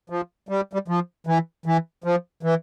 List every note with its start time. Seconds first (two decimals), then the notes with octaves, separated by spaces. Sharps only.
0.10 F3
0.49 G3
0.73 G3
0.88 F3
1.27 E3
1.66 E3
2.04 F3
2.43 E3